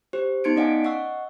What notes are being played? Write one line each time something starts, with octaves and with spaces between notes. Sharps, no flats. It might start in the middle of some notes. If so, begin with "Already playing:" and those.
G4 C5
B3 D#4 C6 G#6 C#7 D7
C#4 D5 D#5 F5 F#5 G#5
D#5 F#5 C#6 E6